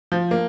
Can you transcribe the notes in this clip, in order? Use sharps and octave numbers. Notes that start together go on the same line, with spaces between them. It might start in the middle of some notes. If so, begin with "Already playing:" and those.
F3
A#3